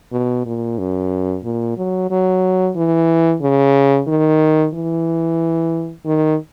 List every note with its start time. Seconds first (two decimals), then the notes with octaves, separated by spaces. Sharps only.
0.12 B2
0.46 A#2
0.79 F#2
1.44 A#2
1.78 F#3
2.11 F#3
2.76 E3
3.42 C#3
4.08 D#3
4.74 E3
6.06 D#3